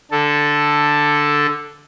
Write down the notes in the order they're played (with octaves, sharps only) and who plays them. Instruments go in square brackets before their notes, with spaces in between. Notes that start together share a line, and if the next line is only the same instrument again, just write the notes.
[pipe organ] D3 A4